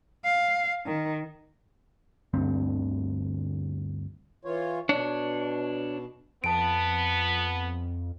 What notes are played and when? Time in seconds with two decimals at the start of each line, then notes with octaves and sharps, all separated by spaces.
0.24 F5
0.86 D#3
2.33 G1 D2 G2 C4
4.45 E3 F4 C#5
4.89 B2 D4 C#5
6.44 F2 B3 A5 D7